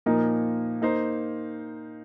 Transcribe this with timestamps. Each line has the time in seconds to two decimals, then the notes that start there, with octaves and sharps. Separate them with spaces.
0.06 A#2 F3 A#3 D#4 A#4
0.82 A#3 D#4 C5